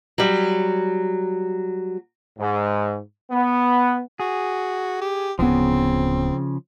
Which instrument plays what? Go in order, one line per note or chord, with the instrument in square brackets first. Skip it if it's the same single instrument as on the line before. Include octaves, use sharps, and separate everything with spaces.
[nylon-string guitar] F#3 G3
[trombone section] G#2
B3
[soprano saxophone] F#4 [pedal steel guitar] G#4
[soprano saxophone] G4
[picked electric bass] D1 B3 [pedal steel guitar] C#3 F3 [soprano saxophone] C4